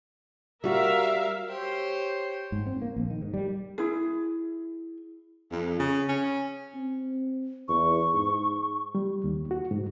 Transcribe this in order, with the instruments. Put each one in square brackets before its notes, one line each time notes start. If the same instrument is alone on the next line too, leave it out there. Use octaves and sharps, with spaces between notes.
[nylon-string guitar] G3 F#4 [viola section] A#4 E5 F5
[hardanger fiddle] G4 C#5 [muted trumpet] C5
[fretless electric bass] G#2
C4
A#3
A#1
D#3
G#2
G3
[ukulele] E4 G#4
[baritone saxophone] F2
C#3
C#4
[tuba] C4
[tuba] E2 [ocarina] C#6
[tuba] G#2
[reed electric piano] G3
D#2
F#4
G#2